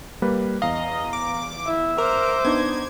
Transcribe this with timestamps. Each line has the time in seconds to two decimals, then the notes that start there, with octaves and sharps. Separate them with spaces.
0.22 G3 A#3 B4
0.62 E2 D#5 F5 A#5
1.13 D6
1.66 E4 E5
1.98 A#4 C5 D6
2.45 B3 D4 D#4 G#6